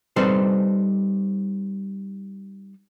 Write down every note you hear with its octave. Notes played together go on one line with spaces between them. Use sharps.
G3 C4 D#4 A4 B4 C5